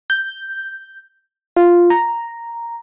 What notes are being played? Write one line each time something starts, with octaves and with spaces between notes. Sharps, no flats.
G6
F4
A#5